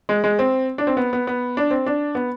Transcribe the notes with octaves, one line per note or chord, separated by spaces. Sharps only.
G#3
G#3
C4
D4
C4
B3
B3
B3
D4
C4
D4
B3